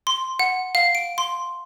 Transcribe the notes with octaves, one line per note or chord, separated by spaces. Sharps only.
C6
F#5
F5
D7
C6